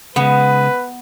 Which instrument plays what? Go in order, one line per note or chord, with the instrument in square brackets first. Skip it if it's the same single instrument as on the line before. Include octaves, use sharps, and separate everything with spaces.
[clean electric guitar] C#3 G#3 [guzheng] B3 [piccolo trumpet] B4